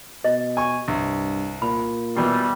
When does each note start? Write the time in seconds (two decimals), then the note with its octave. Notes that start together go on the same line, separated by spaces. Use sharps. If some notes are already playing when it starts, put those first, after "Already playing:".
0.24 B2 D#5
0.57 G#5 C#6
0.88 C2 G2
1.62 A#2 B5
2.17 B2 E3 G3